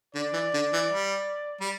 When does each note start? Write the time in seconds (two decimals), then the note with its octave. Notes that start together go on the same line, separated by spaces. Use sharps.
0.15 D3 D5
0.33 E3
0.54 D3
0.73 E3
0.92 G3
1.61 G3